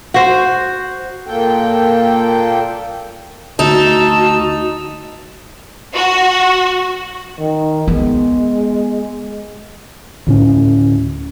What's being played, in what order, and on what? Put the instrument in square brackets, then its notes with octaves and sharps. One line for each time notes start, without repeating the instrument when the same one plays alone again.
[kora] F#4 C5
[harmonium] A#2 A#3 A4 G5
[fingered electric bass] D2 [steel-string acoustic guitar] D#4 [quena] F#4 [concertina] A5 E6
[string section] F#4
[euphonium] D#3
[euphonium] G#3 [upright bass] B3
[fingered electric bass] D2 A2 C#4